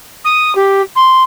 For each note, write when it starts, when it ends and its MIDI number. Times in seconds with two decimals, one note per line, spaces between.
0.25 0.55 87
0.55 0.81 67
0.96 1.23 84